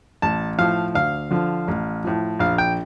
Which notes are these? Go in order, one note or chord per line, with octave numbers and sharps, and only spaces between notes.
A1 A5
A2 F3 F5
D2 F5
D3 F3
A1
A2 F3
A#1 F5
G5